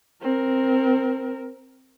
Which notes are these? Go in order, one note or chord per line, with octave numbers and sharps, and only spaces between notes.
C4 A#4